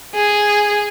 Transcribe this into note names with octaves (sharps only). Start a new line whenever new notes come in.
G#4